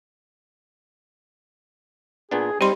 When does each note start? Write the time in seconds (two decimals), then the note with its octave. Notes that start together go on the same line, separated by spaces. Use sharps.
2.31 A#2 B3 D4 G#4
2.61 G3 C4 D#4 G4 B5 C6